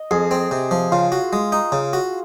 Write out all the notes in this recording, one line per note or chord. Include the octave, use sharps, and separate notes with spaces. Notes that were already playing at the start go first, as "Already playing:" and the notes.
Already playing: D#5
F2 G#4
C4
C3
F3
C#3 F4
F#4
G#3
D#4
C#3
F#4